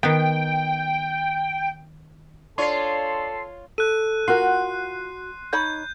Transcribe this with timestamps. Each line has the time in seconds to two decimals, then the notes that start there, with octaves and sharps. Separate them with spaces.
0.03 D#3 B3 G5
2.58 D4 F4 A4 C#5 D5 C6 C7
3.78 A4 F#6 D#7
4.28 F4 F#4 A#4 C6 F#6 C7
5.53 D#4 C#5 B5 G6